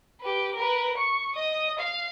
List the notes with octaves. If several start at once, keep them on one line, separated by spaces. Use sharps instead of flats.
G4 B4
A#4 B4
C#6
D#5 D#6
F5